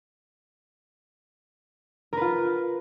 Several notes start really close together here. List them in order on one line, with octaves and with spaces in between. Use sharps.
A#4 B4 F4